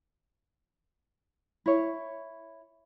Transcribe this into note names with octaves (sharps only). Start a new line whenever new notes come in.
E4 C#5